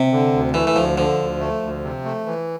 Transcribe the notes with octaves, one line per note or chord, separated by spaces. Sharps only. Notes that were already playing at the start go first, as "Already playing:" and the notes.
Already playing: C3
D3
D2
E3 A3
E3
D2 F3
D3 F3
D2
A3
D2
C3
A3
E3